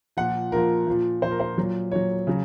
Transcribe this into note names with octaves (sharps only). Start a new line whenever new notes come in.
A#2 F3 F#5
A#2 F3 A#4
A#2 F3
A#2 F3 C5
A#4
C5
A#2 F#3
A#2 F#3 C#5
C#3 F#3